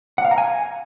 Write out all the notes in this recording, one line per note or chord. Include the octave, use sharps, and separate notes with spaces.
F#5
F5
A#5
G#5